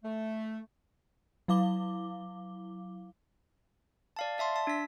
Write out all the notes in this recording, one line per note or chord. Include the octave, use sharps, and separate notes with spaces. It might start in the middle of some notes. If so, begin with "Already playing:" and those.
A3
F#3 E4 F5 D6 G7
D5 F5 A5
D5 E5 A5 C6
A5
D4 B6